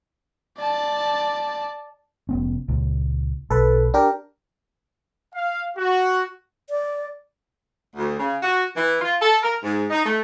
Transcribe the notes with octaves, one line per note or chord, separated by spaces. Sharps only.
D5 A5
F1 B3 C#4
C#2 A#2
B1 A4 B4
D4 G4 A#4
F5
F#4
D5
D2
C#3
F#4
E3
F4
A4
A#4
G#2
D#4
A3